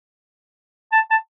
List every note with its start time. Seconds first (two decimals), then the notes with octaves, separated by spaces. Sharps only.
0.92 A5
1.11 A5